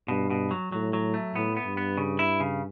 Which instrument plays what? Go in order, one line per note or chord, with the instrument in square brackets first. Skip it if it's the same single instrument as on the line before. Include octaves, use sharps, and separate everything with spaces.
[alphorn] G2 [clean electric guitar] B2
[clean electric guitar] B2
F#3
[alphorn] A2 [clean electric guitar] F#3
[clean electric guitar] F#3
A3
[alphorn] A2 [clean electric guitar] B3
[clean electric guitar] B3
[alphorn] G2
[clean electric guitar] B3
C#3
E4
C#3